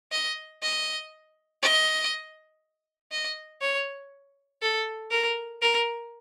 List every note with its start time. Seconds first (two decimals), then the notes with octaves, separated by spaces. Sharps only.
0.12 D#5
0.63 D#5
1.63 D#5
3.12 D#5
3.62 C#5
4.62 A4
5.11 A#4
5.62 A#4